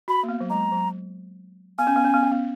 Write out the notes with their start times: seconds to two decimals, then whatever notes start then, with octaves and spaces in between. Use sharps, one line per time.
0.08 F#4 B5
0.23 A#3
0.29 B3
0.40 F#3
0.50 G#3 A#5
0.72 F#3
1.78 B3 G#5
1.87 C#4
1.96 B3
2.05 C#4
2.14 B3
2.23 C#4
2.32 B3